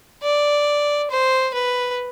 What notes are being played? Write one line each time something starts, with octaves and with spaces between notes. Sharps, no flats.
D5
C5
B4